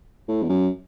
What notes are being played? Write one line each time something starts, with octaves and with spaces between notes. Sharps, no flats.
A2
E2
F#2